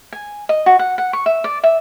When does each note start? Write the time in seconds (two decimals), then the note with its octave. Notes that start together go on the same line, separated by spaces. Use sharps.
0.13 G#5
0.49 D#5
0.66 F#4
0.79 F#5
0.98 F#5
1.13 C#6
1.26 E5
1.44 D5
1.64 E5